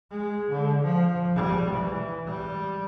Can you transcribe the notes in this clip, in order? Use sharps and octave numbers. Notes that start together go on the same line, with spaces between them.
G#3
D3
F3
G3
E3
G3